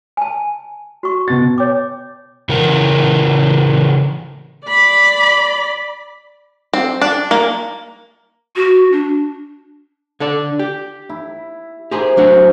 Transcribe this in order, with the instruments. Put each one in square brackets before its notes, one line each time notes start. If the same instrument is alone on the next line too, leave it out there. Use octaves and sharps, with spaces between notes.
[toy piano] G#5 A5
F#4 C#6
[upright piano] B2 A6
[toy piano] C#5 G5 D6
[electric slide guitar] C#3 E3 A#4
[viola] D5 B5
[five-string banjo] C4
D4
A#3
[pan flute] F#4
D4
[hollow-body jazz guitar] D3 A4 D5
G4
[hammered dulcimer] E4
[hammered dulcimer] E4 A#4 C5 [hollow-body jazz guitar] G4 G#4
[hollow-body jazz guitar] F#3 D4 F#4